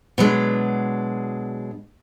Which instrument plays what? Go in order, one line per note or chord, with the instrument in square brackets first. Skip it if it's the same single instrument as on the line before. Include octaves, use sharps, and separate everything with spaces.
[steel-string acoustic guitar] B2 F#3 G#3 D4